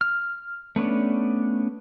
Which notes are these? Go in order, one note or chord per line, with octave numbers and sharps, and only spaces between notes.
F6
A3 B3 C#4 D4